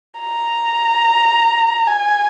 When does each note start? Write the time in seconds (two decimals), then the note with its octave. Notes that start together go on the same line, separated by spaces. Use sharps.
0.20 A#5
1.87 G#5